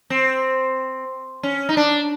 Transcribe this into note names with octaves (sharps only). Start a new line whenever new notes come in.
C4
C#4
D#4
D4